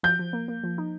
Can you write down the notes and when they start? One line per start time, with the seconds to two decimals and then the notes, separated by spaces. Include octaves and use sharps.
0.03 F3 G6
0.19 F3
0.33 A#3
0.48 A#3
0.64 F3
0.78 D#4